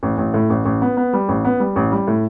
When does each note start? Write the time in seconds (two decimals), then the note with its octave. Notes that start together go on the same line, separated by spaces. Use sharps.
0.03 A1
0.18 A1
0.34 A2
0.50 A1
0.65 A1
0.82 B3
0.97 B3
1.13 G3
1.29 A1
1.45 B3
1.60 G3
1.76 A1
1.92 G3
2.08 A2